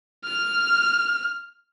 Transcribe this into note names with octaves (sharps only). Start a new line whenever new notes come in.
F6